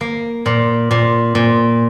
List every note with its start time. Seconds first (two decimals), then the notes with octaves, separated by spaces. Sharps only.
0.01 A#3
0.46 A#2
0.91 A#2
1.35 A#2